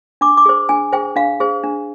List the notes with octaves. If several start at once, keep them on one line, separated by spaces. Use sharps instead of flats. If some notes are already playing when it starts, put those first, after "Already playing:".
D4 D6
D6
G#4 C5
D4 G#5
G#4 C5 G5
D4 F5
G#4 C5
D4